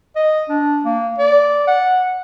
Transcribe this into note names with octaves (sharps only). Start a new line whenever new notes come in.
D#5
D4
A#3
D5
F#5